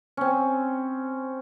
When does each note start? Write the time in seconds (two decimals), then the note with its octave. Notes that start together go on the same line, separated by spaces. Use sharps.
0.17 C4 C#4